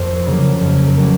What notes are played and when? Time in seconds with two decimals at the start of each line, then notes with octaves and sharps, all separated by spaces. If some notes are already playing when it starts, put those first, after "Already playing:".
Already playing: F2 A#3 C5
0.26 C#3 F#3 A#3
0.61 F2
0.97 C#3 F#3 A#3